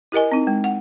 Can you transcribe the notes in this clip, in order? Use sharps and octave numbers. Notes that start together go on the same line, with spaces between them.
E4 G4 A#4 D#5 G#5
C4 D#4
G#3
F#5